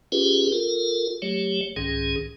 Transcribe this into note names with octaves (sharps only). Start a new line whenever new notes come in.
C#4 F4 G4 G#4 B4
F4 A4 A#4
F#3 A3 G4 C#5
C2 G#2 D#3 C#4 G#4